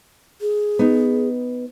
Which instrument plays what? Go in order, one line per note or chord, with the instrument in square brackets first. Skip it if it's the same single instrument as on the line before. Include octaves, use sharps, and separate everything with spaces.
[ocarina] G#4
[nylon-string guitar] B3 D#4